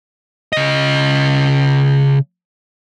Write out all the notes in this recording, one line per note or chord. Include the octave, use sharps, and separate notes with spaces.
C#3 D#5